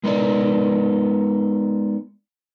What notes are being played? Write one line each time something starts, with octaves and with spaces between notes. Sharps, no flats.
G#3 B3 D#4 A#4 D5